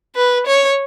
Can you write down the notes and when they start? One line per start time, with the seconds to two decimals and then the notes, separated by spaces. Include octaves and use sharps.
0.16 B4
0.47 C#5